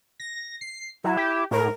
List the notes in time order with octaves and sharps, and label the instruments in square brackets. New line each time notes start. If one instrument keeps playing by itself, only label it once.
[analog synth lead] A#6
C7
[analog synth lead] F#3 [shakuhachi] E4
[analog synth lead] G4
[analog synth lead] A2 [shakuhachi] A#4